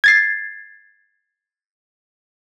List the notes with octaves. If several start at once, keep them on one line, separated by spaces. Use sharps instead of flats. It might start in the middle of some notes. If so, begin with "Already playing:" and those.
G#6 A6 C7